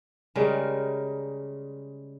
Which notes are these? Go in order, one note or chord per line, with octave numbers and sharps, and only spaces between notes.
C#3 G3 G#3 A#4